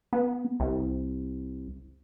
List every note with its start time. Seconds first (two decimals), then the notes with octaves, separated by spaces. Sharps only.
0.13 B3
0.60 C2